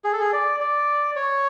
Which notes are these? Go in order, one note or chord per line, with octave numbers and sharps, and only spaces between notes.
G#4
A4
G#4
D5
D5
C#5